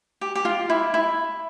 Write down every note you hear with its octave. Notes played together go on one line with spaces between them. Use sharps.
G4
G4
F4
E4
E4